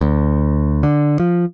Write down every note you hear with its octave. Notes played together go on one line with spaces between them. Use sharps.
D2
D3
F3